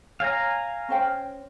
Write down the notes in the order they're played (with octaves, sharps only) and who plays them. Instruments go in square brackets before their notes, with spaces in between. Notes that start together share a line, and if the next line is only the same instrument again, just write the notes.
[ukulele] C#5 [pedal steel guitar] F5 G#5 A#5
[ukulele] C#4 C5 G5